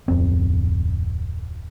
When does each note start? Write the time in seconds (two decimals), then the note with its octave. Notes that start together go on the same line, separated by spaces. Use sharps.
0.08 D1 F2 C4